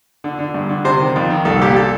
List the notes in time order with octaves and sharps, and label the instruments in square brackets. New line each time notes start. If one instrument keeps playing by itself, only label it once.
[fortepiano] D3
D3
G2
D3
C3 C5
D#3
F2
D#3
C2 A4
A#2 G4
A4